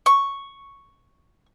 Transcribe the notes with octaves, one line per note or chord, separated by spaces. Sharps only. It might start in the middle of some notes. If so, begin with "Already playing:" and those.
C#6